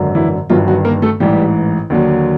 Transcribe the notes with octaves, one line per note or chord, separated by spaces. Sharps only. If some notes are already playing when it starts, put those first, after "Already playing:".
Already playing: G#1 F#2 D3 F#3
E3 E4
G1 G2 D#3 F3 F#3 F4
F#3 F#4
A#3 A#4
A3 A4
A1 G#2 E3 G3 G4
D#2 D3 F#3